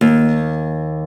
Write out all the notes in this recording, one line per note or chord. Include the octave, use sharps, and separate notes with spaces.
D#2